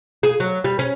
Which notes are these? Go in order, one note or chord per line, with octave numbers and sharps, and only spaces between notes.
G#4
F#3
G3
C#4